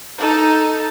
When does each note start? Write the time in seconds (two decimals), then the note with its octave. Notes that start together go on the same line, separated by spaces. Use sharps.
0.18 D#4 A4